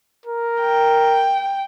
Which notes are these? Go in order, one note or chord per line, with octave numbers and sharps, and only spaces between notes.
A#4
G5